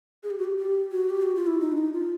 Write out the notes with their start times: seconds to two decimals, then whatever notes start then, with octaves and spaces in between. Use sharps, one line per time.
0.23 G#4
0.30 G4
0.38 F#4
0.44 G4
0.57 G4
0.92 F#4
1.10 G4
1.22 F#4
1.35 F4
1.47 E4
1.60 D#4
1.72 D4
1.78 D#4
1.94 F4